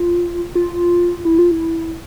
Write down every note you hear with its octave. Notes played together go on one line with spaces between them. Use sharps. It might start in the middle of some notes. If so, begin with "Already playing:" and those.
Already playing: F4
F4
E4
F4
E4